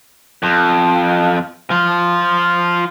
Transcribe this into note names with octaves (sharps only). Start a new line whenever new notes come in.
F2
F3 F4